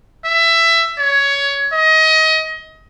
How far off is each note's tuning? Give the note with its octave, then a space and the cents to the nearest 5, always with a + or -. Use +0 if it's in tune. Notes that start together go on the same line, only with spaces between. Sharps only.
E5 +15
C#5 +15
D#5 +25